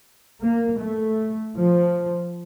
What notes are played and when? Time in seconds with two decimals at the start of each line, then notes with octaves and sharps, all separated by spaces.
0.43 A#3
0.80 A3
1.57 F3